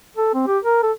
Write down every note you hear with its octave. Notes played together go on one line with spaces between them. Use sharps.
A4
C4
G4
A#4
A4